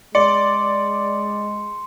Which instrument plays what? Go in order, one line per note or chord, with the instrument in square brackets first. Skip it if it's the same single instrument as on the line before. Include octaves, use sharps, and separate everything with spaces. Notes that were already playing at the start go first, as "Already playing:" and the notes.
[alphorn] G#3 [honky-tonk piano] D5 [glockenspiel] C6 C#7